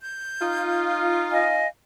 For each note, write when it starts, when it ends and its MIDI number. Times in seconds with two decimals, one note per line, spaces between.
0.01 0.96 91
0.41 1.62 63
0.41 1.62 65
1.31 1.67 75
1.31 1.67 77
1.31 1.67 80